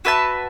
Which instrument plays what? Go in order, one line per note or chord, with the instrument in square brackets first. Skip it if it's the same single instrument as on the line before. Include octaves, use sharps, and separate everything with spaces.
[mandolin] F#4 B4 E5 A5